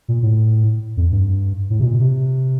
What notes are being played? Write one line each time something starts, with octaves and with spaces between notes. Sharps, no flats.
A#2
A2
F2
G2
A2
C3
A#2
C3